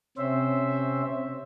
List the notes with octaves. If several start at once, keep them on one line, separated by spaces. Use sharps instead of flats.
C3 C4 C#4 C5 E5